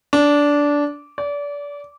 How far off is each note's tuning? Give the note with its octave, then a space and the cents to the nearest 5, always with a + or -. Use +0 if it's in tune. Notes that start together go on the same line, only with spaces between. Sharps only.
D4 -15
D5 -30